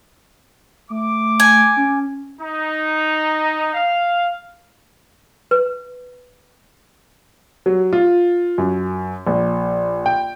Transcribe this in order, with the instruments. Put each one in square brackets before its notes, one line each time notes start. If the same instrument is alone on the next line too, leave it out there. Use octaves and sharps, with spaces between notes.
[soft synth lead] A3 [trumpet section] D6
[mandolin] G#5
[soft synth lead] C#4
[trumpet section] D#4
F5
[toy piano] B4
[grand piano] F#3
F4
F#2
A#1
G5